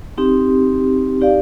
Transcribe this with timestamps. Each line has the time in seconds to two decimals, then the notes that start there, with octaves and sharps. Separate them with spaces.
0.18 C4 D#4 G4
1.21 D#4 G4 D5 F5